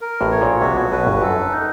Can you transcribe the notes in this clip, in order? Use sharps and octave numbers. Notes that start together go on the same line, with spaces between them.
A#4
A1 A2
C#5
A#1 A#2
C2 C3 F#4
B1 B2
B1 B2 B4
G1 G2
F#2 A4
F#2
D#4